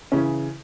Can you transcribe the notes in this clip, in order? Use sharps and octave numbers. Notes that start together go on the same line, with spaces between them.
C#3 E3 C#4